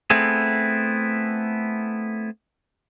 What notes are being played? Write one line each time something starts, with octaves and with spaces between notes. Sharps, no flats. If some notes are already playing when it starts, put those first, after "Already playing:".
A3 B3 C4 E4 G#4